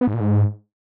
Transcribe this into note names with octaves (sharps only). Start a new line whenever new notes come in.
B3
G#2
A#2
G#2